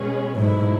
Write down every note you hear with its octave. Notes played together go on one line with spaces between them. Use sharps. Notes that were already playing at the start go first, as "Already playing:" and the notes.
Already playing: B2 G#3 C#4 G#4 B4
G#2 B2 F#3 A3 E4